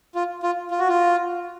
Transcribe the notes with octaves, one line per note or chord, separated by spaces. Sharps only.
F4
F4
F4
F#4
F4